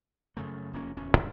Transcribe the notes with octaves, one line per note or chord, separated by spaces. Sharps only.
F#2 C#3 A3
F1 A#3 C#4
D1 E2 C#4
F#2 D3 G3